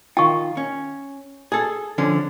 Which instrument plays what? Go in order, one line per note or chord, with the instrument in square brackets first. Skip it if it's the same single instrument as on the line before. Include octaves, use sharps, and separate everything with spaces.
[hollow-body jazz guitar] D#3 F4 [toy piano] G5 C#6
[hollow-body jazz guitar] C#4
G#4 A4
D3 F3 C#4